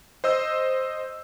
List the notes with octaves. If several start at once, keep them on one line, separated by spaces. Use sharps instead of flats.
C5 D#5 E6